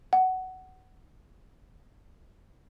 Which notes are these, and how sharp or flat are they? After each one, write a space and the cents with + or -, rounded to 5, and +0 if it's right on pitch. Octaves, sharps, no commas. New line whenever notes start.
F#5 +15